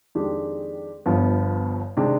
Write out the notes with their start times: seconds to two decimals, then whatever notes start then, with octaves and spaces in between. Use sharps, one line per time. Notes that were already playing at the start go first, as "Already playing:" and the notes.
0.15 F2 D#3 G#3 D4 G4
1.06 G1 G2 F3 B3
1.97 C3 D#3 G#3 D4